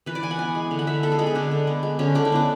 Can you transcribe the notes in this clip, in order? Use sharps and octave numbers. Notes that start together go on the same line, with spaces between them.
E3 B4
D5
E3 G#5
F#5
B3 G#5
G#3
D3
F#5
D3 E5
B3 A4
G#4
G#3 A4
G#4
D3 D4
D3
B3
G#3
D3 C#4
D3 D4
E4
B3 D4